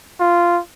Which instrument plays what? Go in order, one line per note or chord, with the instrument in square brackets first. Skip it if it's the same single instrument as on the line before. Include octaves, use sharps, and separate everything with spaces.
[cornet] F4